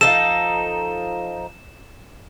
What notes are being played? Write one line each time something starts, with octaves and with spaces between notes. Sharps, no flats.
F3 D#4 A4 E7